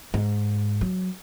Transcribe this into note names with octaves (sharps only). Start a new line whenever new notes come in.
G#2
F#3